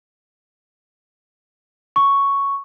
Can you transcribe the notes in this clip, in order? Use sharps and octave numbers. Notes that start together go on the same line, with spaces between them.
C#6